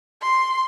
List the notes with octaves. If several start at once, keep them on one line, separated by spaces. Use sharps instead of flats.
C6